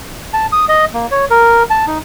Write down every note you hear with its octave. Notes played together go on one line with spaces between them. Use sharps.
A5
D#6
D#5
A#3
C#5
A#4
A5
D#4